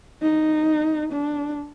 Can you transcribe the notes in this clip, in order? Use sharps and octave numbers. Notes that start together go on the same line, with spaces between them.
D#4
D4